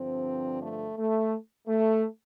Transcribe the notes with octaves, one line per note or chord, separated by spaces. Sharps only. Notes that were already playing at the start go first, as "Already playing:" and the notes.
Already playing: G2 D3 F3 C4
A3
A3
A3